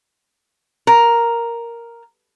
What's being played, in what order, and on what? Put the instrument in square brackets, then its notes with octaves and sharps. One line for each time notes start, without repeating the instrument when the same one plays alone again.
[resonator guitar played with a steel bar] A#4